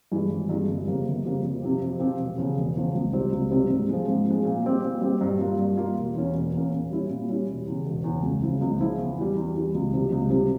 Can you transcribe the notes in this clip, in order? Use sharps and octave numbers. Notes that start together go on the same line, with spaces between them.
G2 E3 G#3
G#1
G2 E3 G#3
G1
F2 C#3 G3 A#3
G1
F2 C#3 G3 A#3
F2
C3 F3 C4 G4
F2
C3 F3 C4 G4
E1
E2 C#3 F3
E1
E2 C#3 F3
C#2
C3 G3 C4
C#2
C3 G3 C4
G#2
F3 G#3
G#2
F3 G#3
A#2
G3 C4 G4
A#2
G3 C4 G4
G2
G3 A#3 F4
G2
G3 A#3 F4
E1
E2 E3 A#3 C#4
E1
E2 E3 A#3 C#4
A#2
G3 C#4 E4
A#2
G3 C#4 E4
E1
E2 C#3
E1
E2 C#3
C#2
C#3 F3 G#3 E4
C#2
C#3 F3 G#3 E4
E2
E3 G3
E2
E3 G3
C#2
C3 G3
C#2
C3 G3